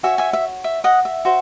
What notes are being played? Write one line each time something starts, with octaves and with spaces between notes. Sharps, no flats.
F#4 C#5 E5 G#5
E5 G#5
E5
E5
D#5 F#5
E5
F#4 C5